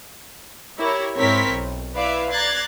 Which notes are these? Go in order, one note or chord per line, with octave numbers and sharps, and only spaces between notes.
E4 G4 A#4 C#5
G#2 C4 E4 A#4 C#5 B6
B1
E4 B4 D5 E5 F5
D5 A#5 F#6 G#6 A6 C7